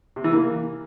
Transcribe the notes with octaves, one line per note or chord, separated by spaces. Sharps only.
C3
E3
A#3